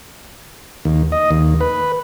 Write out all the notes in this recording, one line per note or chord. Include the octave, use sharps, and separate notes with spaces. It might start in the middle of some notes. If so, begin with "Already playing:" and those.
D#2
D#5
D#2
B4